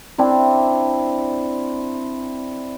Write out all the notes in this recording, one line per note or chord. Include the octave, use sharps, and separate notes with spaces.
C4 D4 E4